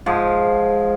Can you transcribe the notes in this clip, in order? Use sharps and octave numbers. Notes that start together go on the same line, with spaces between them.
G#2 F3